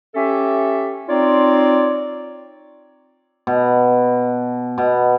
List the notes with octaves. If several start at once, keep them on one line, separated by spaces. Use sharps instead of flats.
C#4 G4 A4 E5
C4 D#4 F4 C#5 D5
B2
B2